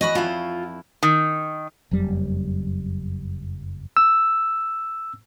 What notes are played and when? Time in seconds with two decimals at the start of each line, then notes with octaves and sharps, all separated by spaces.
0.01 E2 F#4 D#5 B5
0.15 F2 E4 F4
1.03 D#3
1.91 F#1 F2 F#3 G3
3.97 E6